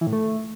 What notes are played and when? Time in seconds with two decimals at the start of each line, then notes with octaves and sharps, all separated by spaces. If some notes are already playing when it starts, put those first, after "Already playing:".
0.01 E3
0.07 A2
0.13 A3